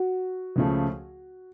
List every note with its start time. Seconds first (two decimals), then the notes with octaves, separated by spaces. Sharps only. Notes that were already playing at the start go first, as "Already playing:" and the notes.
Already playing: F#4
0.56 C#2 C#3 F3 A3